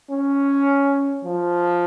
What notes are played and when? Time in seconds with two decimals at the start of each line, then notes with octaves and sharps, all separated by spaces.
0.10 C#4
1.24 F3